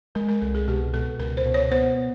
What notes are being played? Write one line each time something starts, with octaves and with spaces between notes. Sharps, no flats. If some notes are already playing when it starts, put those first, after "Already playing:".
G#3 A#4
A#4
C2 A4
G#4
B2 G4
B2 A4
C#2 A#4
C5
B2
C#5
B3 C5